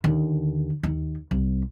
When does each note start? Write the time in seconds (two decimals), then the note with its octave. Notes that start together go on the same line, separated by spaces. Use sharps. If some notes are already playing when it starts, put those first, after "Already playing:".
0.04 D#2 D3
0.83 D#2
1.31 C2